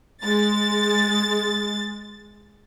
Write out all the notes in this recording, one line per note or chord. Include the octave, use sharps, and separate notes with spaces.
G#3 A6